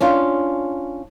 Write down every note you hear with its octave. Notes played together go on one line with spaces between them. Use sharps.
C#4 D4 F4